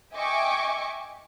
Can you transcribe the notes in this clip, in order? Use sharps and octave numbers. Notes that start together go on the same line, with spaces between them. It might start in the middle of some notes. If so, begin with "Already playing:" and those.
D#5 E5 G5 G#5 C#6 D6